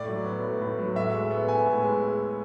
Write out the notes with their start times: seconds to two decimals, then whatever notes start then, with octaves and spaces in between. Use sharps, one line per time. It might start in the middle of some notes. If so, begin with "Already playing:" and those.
Already playing: A2 D5
0.08 F#3
0.26 B3
0.43 A2
0.61 A2
0.79 F#3
0.96 A2 E5
1.13 G#3
1.31 B3
1.48 A2 G#5
1.66 A2
1.84 G#3